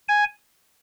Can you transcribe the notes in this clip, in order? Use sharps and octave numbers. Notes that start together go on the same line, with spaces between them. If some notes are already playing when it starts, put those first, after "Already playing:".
G#5